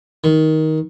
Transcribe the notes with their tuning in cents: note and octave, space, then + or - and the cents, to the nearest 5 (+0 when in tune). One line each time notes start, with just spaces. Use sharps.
D#3 +15